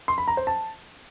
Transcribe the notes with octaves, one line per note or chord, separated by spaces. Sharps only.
C6
B5
A#5
C5
A5